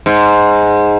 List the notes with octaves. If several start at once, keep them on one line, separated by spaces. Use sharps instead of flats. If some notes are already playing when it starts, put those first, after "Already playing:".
G#2